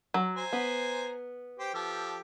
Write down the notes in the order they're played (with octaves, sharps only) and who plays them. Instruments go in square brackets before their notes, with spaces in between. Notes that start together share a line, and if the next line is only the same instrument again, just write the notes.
[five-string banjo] F#3
[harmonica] C5 G#5 A#5
[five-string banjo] B3
[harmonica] G4 C5 G5
F3 G4 A4